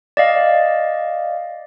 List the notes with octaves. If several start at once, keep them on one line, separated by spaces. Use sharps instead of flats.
D5 D#5 F5